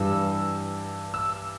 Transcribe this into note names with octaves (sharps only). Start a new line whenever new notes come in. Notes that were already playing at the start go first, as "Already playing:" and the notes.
Already playing: G2 E3 G3 E6
E6